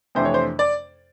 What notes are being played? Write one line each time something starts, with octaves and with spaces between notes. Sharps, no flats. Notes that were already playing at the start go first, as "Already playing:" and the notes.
F2 C3 E3 A3 D4 C5
C#5
C5
D5